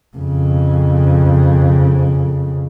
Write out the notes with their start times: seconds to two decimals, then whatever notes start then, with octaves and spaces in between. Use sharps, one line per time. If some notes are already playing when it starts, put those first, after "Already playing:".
0.16 F2 C#3